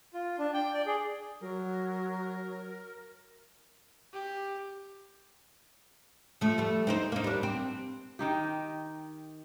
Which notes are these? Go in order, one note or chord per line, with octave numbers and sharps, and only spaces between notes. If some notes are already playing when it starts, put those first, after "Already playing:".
F4
D4
G5
D5
G#4
F#3 A#4
G4
F3 A3
G3 A3
C4 D#4 C5
A#3 D#4
G3 D4
C4
D#3 D#4 G4